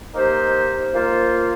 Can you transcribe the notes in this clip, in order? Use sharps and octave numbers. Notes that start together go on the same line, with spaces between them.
A#3 D#4 G4 C5
A#3 F4 C5